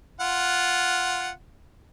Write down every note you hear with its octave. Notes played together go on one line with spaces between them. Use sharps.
F4 F#5